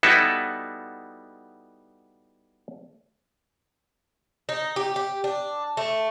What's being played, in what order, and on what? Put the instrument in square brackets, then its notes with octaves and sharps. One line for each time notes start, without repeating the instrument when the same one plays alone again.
[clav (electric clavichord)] G3 B3 D#4 E4 F#4 A4
[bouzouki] D#4
G4
G4
D4
A3